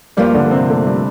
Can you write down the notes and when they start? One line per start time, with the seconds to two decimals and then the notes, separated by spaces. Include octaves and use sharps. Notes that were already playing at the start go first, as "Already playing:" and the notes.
0.17 G2 F3 G3 A#3 G4
0.34 D3 D4
0.51 C3 C4
0.70 A3
0.87 G3